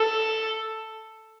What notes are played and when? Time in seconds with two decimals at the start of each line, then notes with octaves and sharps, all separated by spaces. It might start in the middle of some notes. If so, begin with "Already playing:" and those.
Already playing: A4